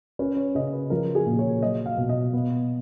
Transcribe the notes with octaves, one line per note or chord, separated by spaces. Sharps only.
C#4 B4
C#5
C#3 D#5
B4
F3 A#4
G#4
A#2
C#5
F#3 D#5
F5
B2
D#5
B3